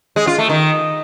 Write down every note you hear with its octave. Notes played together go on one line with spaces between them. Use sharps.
G#3
F4
A3
D#3